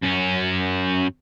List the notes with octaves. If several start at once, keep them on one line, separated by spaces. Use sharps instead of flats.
F#2 C#4